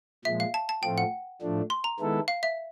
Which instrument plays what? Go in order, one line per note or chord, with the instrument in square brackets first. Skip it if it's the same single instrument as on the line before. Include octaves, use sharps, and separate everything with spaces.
[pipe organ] A#2 F3 G#3 [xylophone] E5
[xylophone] F5
A5
A5
[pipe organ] A2 F3 A3 C4 F4 [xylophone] G5
[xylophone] F#5
[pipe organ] A2 F3 A3 D4
[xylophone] C6
A#5
[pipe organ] D#3 G#3 B3 E4 A4
[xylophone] F5
E5